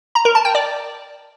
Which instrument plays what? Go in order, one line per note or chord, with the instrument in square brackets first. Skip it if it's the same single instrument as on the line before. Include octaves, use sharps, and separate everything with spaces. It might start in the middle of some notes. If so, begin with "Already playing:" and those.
[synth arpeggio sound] A#5
A#4
A5
G5
D5